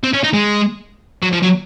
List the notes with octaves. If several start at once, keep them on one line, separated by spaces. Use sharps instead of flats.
C4
C#4
D#4
G#3
F#3
F3
F#3